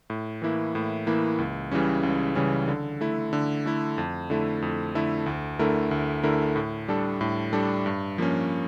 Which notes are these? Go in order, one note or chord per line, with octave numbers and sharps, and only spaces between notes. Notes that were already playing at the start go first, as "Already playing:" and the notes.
A2
E3 A#3 E4
A2
E3 A#3 E4
C#2
C#3 E3 G3 C#4
C#2
C#3 E3 G3 C#4
D3
A3 E4
D3
A3 E4
F2
D3 A3 E4
F2
D3 A3 E4
D2
D3 A3 E4 A#4
D2
D3 A3 E4 A#4
A2
G3 D4 A4
A2
G3 D4 A4
G2
F3 A#3 C#4